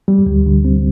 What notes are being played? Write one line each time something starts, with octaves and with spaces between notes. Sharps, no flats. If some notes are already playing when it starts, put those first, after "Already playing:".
G3
D2
D3
C4